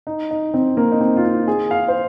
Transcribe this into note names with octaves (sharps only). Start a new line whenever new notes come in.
D#4
D#4
C4
A#3
D#4
C4
F4
D#4
G#4
F5
C5